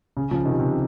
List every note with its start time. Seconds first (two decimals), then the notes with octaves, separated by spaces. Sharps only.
0.17 C#3
0.31 C#3 F3
0.45 C3 D#3
0.60 C3